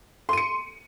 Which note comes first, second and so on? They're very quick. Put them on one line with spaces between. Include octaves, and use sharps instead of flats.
C6 D#7 C#7